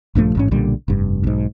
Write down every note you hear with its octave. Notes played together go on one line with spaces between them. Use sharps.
A#1 G2 F3 A3
A1 G#2 C#4
B1 A#2 D3 G3
F1 G2
B1 G#2